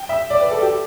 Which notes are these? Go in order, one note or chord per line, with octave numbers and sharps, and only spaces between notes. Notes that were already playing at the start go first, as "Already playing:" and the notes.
Already playing: G5
E5
D5
B4
A4
G4